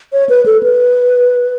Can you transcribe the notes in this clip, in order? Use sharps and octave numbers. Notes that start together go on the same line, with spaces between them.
C#5
B4
A4
B4